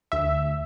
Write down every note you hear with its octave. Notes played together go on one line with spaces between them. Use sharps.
D2 E5